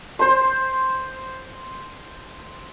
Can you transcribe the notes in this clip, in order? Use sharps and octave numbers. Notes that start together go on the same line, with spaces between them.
C5 C6